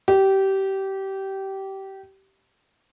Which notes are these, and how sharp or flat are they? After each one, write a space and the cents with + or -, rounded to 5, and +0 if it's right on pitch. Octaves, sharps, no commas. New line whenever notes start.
G4 -20